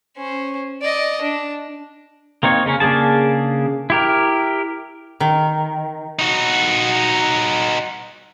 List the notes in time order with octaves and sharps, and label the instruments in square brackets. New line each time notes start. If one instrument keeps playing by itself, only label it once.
[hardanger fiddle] C#4 C5
D5 D#5
D4
[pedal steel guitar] A#3 C4 D#4 C#5
C#3 A#3 C#4
C#3 A#3 D4 G#4 A5
E4 G4 A#4
[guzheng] D#3
[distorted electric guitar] D#4 F#4